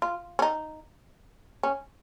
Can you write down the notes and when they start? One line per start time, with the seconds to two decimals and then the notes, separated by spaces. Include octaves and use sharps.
0.02 F4
0.39 C#4
0.42 D#4
1.63 C#4